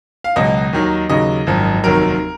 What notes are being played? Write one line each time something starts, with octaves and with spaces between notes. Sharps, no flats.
F5
C#2 B2 F#3 D#5
D#2 D#3 F#3
D#2 C#3 F#3 D#5
G#1 F#2 F3
F1 D#2 D#3 F#3 A#4